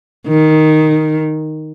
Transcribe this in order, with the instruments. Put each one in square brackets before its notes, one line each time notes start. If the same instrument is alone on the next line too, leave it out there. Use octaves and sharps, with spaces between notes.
[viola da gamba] D#3